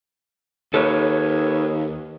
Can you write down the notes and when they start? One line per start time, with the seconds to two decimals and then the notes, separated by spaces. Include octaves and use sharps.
0.74 D#2 A4 B4 C#5